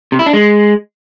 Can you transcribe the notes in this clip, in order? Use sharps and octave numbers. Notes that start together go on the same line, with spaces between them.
C3
E4
D4
G#3